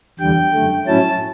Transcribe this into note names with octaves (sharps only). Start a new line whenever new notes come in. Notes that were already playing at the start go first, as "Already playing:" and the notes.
E2 D3 G3 G5
F#2 D3 A3
A2 F#3 C#4 E4 A5